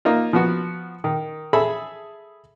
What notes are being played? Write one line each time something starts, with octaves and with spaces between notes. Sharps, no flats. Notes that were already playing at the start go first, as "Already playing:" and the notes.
A#3 D#4 F4
F3 B3 F#4
D#3
G#4 A4 E5 B5